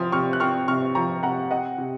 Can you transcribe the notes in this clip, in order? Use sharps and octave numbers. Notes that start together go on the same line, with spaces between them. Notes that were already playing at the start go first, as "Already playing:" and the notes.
Already playing: C3 F3 C6 D#6 F6
C3 C#6 F6
F#6
C4 C#6 F6
C3 C#6 F6
F3 A#5 C#6
C3 F#5 A#5
C4 D#5 F#5
C3